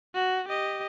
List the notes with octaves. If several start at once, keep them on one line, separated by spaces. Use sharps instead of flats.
F#4
G4 D#5